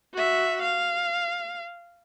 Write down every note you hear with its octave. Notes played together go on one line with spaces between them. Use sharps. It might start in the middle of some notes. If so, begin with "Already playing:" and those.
F#4 E5
F5